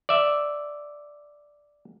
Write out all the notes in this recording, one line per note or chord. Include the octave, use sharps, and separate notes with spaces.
D5 E5